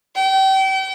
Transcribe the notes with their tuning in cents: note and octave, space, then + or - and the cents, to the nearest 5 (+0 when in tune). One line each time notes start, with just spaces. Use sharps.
G5 -35